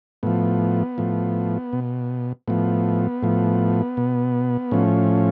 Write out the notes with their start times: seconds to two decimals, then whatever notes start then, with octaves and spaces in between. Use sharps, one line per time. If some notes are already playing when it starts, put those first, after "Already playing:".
0.23 A2 F3 B3
0.98 A2 F3
1.73 B2
2.48 A2 F3 B3
3.23 A2 F3
3.97 B2
4.72 A2 F3 C#4